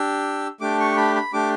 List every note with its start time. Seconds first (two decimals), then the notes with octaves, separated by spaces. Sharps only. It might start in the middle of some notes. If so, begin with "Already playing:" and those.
Already playing: D4 G4 E6
0.61 A3 D4 G4 D6
0.80 C#6
0.97 B5
1.15 B5
1.33 A3 D4 G4 D6